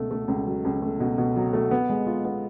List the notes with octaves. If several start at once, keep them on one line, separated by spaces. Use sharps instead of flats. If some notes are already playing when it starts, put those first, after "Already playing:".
Already playing: C#2 B2 A3
A3
C#2
F#3
C#2
A3
B2
B2
F#3
A3
B3
G#3
F4
B3